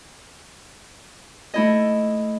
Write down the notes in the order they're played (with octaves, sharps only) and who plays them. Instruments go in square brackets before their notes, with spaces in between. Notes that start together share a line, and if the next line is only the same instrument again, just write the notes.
[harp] A3 E4 D#5